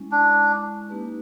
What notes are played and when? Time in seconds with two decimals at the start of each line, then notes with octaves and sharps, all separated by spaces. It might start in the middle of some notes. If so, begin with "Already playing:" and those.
Already playing: G#3 C#4 E4
0.12 G#3 C#4 D4 E4
0.89 A#3 D#4 G4 B4